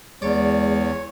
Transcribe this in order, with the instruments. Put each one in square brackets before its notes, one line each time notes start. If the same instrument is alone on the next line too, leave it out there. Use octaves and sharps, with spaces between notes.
[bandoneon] E2 [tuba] G#3 [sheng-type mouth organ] C#5 [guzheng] D5